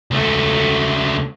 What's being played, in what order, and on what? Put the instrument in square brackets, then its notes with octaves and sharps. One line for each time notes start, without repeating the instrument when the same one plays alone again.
[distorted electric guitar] C#2 A3